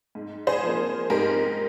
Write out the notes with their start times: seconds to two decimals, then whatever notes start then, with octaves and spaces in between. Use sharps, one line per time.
0.15 G#2
0.47 G#4 C5
0.62 F3 A#3
1.10 G#2 G4 A#4